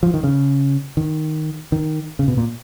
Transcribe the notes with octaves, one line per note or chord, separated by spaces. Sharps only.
F3
D#3
C#3
D#3
D#3
C#3
B2
A#2